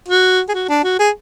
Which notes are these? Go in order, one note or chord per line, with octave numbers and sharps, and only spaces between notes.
F#4
G#4
F#4
D4
F#4
G#4